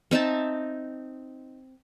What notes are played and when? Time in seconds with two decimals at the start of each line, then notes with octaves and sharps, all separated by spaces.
0.11 C4 D#4 E5 A5